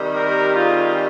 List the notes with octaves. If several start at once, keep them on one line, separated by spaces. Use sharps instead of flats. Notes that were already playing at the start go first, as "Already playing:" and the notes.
Already playing: C3 D#3 G3
G4 A#4
F4 G#4